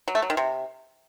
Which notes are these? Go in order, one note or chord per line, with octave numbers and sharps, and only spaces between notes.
F#3
A3
F#3
D#3
C3